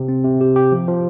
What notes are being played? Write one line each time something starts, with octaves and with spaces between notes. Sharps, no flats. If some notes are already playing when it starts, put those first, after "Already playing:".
Already playing: C3
C4
C3
G4
G4
F3
F3